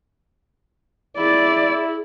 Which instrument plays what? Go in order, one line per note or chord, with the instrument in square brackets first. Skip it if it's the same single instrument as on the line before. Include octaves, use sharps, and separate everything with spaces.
[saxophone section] E4 [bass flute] G#4 [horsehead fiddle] D5